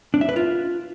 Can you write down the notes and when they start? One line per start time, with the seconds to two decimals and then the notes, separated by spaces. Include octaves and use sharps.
0.14 D4
0.21 E5
0.29 B4
0.36 F4